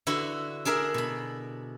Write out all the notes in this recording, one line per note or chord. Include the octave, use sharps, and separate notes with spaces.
D3 E4 F#4 B4
D4 G#4 A#4 E5
B2 B5